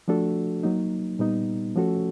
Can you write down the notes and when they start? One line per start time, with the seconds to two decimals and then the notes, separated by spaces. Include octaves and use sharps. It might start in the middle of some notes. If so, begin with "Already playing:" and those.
0.08 F3 A3 D4 F#4 A4
0.63 F#3 A#3 D#4
1.19 A#2 G3 B3 D#4
1.76 F3 A3 C#4 F#4 A4